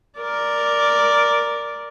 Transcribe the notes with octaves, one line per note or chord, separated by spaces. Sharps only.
A#4 D5